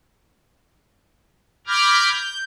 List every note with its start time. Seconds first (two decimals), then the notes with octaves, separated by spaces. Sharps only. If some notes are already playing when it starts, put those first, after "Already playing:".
1.67 B5 D6 F6 G6 G#6 A#6
2.12 G6